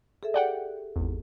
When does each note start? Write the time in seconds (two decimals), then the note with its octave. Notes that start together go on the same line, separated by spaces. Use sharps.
0.23 G#4 A4 E5
0.34 G4 D5 F#5 G5
0.96 G#1 E2